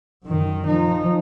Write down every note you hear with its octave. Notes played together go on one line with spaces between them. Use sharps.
F#2 D#3
F3 D#4